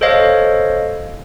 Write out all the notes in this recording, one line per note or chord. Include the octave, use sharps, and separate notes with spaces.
A4 C5 C#5 D#5 F5